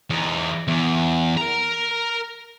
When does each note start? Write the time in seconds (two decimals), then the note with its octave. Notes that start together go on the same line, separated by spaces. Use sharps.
0.10 E2 D#4
0.68 E2
1.37 A#4 A#5